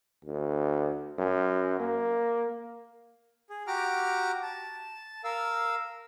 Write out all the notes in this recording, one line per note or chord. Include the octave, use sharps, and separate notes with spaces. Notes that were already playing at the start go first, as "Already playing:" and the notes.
D2
F#2
A#3
G#4
F#4 G4 A#5 D6 F6
A5
A#4 F5 E6